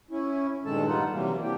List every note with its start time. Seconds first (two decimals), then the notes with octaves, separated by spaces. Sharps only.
0.11 C#4 E4
0.65 G2 A#2 D#3 G#3 A4 A5
0.86 G3 D#4 F4 F#5
1.12 C3 E3 F#3 G3 A#3
1.43 A#3 C4 D4 E4 G4 G5